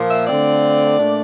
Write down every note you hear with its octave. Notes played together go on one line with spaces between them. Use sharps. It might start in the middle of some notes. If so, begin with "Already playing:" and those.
Already playing: A#2 F3 A#3
E5
D3 A3 C4 F4 D5
A#2 A3 D4